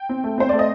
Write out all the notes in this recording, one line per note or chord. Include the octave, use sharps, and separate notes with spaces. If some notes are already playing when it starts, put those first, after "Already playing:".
Already playing: G5
C4
A3
C4 C5
A3 D5
D#5